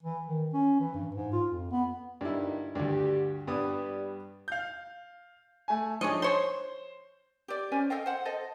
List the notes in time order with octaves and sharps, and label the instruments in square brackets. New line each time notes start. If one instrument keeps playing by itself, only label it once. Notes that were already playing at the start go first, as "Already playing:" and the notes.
[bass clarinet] E3
D#3
C#4
E3
G2
G#2
F4
F2
B3
[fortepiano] G2 E4 [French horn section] A#2 D3 D#4
[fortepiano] D2 G2 [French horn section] D3 F#4 G4
[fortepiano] G2 B3 D#6 [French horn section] G3
[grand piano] F5 G6
A3 G#5
[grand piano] F3 D4 D#4 [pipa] G#4 C#5 D#5
[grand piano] C5 [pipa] C#5 C6
[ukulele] G4 D5
C#4 C5 D5 G#5
A4 D#5 F5 G5
C5 F#5
A4 C5 D#5